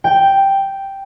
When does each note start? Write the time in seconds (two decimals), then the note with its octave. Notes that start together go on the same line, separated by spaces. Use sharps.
0.04 G5